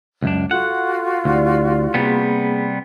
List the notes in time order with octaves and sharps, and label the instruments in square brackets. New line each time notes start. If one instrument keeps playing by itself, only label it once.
[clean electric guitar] C#2 F#2 D4
[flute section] F4 F#4 [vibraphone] A4 [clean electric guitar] F#5
[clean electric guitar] D2 [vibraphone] E4 G4 D5
[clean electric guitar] C3 G3 B3 [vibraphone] A#3 G#4